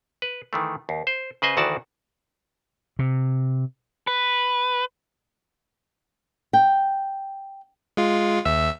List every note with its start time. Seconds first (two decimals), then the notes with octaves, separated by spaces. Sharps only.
0.22 B4
0.53 D#3 E3 A3
0.89 D#2
1.07 C5
1.42 C#3 B4 C5 D#5 G#5
1.57 D2 D#3 E3 F#4 D5 A5
2.99 C3
4.07 B4
6.53 G5
7.97 G#3 F4
8.45 D#2 E5 E6